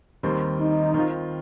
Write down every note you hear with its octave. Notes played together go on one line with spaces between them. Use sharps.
D#2 D#3 G3 C4
D#4
D#3 C4 F4